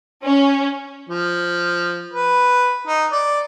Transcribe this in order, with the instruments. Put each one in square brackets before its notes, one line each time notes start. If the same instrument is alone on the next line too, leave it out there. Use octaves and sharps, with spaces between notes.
[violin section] C#4
[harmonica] F3
B4
D#4
D5